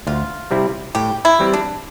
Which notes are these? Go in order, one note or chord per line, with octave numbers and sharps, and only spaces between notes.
D2 F4
C3 G3 C4 E4
A2 G4
E4
E3 G3 C4 G4
D4